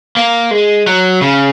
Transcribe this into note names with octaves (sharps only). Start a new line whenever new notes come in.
A#3
G#3
F#3
C#3